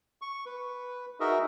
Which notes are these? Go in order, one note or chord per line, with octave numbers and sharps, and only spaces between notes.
C#6
B4
D#4 F#4 G#4 A#4 D#5 E5